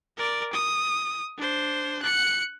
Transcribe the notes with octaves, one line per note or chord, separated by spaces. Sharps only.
A#4 D5
D#6
D4 C5
F#6 C#7